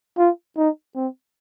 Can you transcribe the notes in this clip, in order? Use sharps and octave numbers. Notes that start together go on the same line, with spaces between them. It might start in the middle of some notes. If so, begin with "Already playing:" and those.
F4
D#4
C4